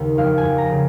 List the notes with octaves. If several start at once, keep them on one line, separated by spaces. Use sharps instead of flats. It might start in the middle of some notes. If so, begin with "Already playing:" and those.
Already playing: D#2 C#3
F2 F5
G#5
F2
A#5
C#3